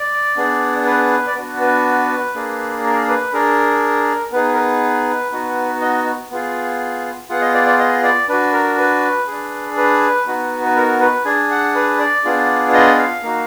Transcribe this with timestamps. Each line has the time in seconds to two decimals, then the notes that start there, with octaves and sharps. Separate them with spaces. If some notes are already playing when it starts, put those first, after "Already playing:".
Already playing: D5
0.37 B3 D4 G#4
0.86 B4
1.27 D5
1.35 B3 D4 F#4 B4
1.60 B4
2.35 A#3 D4 G#4
2.84 A#4
3.08 B4
3.33 D4 G#4 A#4
4.32 B3 D#4 G#4 B4
4.54 A#4
4.57 B4
5.32 B3 D#4 F#4
5.81 D#5
6.31 B3 F4 G#4
7.29 B3 F4 G#4 F#5
7.41 D#5
7.54 D5
7.66 D5
7.79 D#5
8.03 D5
8.29 D4 F#4 B4
8.53 A#4
8.78 B4
9.27 D4 G#4
9.77 B4
10.27 B3 D#4 F#4
10.65 B4
10.76 A#4
11.00 B4
11.25 D4 G#4 G#5
11.51 F#5
11.75 B4
12.00 D5
12.25 B3 D4 F4 G#4
12.74 D#5
12.98 F5
13.23 A#3 D#4 F#4